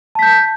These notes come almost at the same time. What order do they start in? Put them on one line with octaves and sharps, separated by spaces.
A5 B6 G6